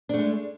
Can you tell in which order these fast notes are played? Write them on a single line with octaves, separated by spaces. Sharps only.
D4 A3 G#3